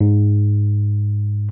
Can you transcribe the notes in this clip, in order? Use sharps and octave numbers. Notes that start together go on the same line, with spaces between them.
G#2